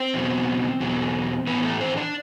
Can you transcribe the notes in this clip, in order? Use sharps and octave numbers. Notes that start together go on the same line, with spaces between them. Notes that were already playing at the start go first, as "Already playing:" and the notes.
Already playing: C4 C5
E2 B2 F#3
E2 B2 F#3
A2 E3 B3 B4
A3 A4
C4 C5
D4 D5